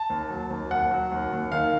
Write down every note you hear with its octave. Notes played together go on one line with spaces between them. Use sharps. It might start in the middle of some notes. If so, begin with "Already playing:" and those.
Already playing: A5
D#2
F#3
D#2
D#2 F#5
F#3
D#2
D#2
D#3 F5